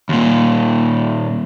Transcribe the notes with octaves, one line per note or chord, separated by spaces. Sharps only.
D#2 A#2